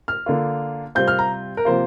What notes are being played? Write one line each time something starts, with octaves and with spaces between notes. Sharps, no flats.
F6
D3 A#3 F4
C3 G3 C4 F4 G6
F6
A#5
A#4
C3 F3 A#3 F4 C5